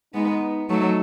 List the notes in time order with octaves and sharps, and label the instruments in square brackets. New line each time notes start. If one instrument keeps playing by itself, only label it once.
[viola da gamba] G#3 B3 [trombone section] D#4
[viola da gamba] F#3 A3 [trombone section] D#4